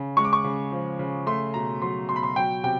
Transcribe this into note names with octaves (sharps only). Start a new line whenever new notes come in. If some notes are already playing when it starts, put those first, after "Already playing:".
Already playing: C#3
G#3 C#6
D6
C#6
C#3
F3
C#3
A3 C6
B2 A#5
F#3 C6
B2 C6
B5
C6
F#3 G5
C3 G5